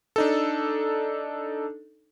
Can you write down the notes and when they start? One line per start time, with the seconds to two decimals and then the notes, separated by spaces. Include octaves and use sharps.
0.16 D4 D#4 A4